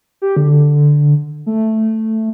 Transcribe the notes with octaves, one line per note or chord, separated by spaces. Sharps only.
G4
D3
A3